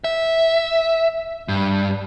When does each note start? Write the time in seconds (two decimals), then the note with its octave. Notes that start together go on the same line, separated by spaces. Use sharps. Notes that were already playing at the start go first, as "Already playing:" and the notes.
0.04 E5
1.48 G2